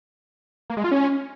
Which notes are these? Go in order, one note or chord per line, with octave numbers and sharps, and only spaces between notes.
A#3
G#3
F4
C#4